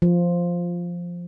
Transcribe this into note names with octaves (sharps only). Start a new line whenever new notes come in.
F3